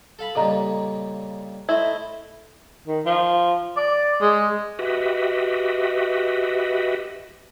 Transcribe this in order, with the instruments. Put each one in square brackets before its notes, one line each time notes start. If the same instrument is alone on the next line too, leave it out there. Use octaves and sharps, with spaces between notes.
[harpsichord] A4 F5 B5
[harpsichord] G2 A#2 C#3 [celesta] A4 D#5 A#5
[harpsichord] A3 C5 D#5 [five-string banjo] E4
[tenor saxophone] D#3
F3
D5
G#3
[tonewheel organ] F#4 G4 B4 D#5 E5